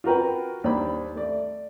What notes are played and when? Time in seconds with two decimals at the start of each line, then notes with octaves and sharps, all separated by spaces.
0.04 F4 F#4 A#4 B4 G5
0.64 D#2 D4 C5 B5
1.16 A3 D5